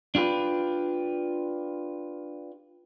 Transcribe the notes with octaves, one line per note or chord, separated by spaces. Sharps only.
D4 F4 G4 B4